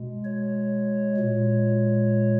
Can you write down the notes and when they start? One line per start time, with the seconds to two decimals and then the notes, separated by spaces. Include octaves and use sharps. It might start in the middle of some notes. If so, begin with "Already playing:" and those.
Already playing: B2 G#3
0.25 C#5
1.17 A#2 G#3